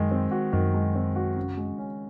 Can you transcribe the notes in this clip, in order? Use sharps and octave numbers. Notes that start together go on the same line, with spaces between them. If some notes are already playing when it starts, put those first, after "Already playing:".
Already playing: F#2 D#3 G#3
C4
F#4
F#2 D#3
G#3
C4
F#4
C#3
G#3
C#4